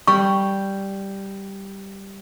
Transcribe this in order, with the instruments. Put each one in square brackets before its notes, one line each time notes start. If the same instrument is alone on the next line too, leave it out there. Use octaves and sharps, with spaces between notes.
[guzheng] G3 [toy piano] C#6